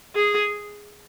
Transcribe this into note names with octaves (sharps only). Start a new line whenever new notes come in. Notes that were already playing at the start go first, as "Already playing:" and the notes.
G#4